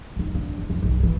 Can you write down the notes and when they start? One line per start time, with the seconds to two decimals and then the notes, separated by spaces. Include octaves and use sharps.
0.16 A1 D#2
0.35 D3
0.58 E2
0.70 F#2 G3
0.83 B1 D#3
1.00 D#3 E3